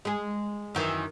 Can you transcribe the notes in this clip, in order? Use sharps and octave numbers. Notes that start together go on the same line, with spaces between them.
G#3 G#4
F#2 D#3 E3